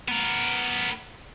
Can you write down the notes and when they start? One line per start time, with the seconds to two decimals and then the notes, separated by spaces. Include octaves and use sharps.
0.08 B3 A#4